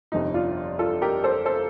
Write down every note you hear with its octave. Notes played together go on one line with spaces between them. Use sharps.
G1 F2 C3 D#4
D4 F4
F4 A4
G4 A#4
A4 C5
A4 C5